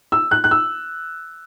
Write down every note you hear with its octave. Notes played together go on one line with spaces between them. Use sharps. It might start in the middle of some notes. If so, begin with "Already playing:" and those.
E6
F#6
F#6
E6